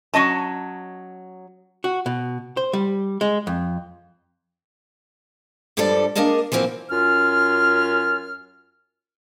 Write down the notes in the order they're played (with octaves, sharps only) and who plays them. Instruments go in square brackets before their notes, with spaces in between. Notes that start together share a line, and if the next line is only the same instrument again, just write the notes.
[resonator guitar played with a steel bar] F#3 C#4 D#5 A5
[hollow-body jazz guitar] F#4
B2
C5
G3
G#3
F2
[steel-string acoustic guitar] D2 G2 F3 G3 A4 D5
A#3 D4 G#4 A#4 D#5 A5
E3 F3 A#3 C4 F#4
[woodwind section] F#2 C#4 F4 F6